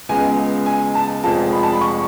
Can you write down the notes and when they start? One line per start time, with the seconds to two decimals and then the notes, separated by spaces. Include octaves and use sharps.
0.09 C#2 C#3 G#3 B3 G#5
0.66 G#5
0.95 A5
1.24 F1 F2 F3 G#3 A5
1.52 B5
1.63 A5
1.72 B5
1.81 C#6